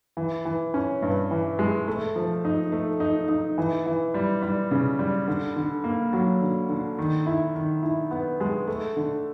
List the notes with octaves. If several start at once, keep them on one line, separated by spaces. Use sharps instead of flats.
E3
E3
C#4
G2
E3
G#3
A3
F3
D#4
A3
D#4
D#4
E3
E3
G3
G3
C#3
G3
D3
D3
A#3
F#3
D3
D3
D#3
E4
D#3
E4
B3
G#3
A3
D3